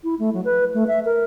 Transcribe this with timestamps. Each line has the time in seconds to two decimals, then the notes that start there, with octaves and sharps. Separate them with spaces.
0.04 E4
0.19 A3
0.34 F#3
0.45 B4
0.74 A3
0.87 E5
1.05 A#4